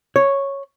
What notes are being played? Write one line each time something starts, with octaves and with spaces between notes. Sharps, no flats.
C#5